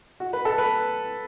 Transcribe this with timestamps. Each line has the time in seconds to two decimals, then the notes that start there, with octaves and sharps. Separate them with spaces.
0.20 F#4
0.33 B4
0.45 A4
0.58 B4